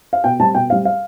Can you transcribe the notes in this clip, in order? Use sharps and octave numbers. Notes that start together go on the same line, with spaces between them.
F5
B2 G5
G3 C4 A5
B2 G5
G3 C4 F5
F5